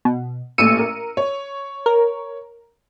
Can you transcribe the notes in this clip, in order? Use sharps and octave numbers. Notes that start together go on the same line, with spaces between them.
B2
A1 A#2 A3 E6 C#7 D#7
A#4
C#5
A#4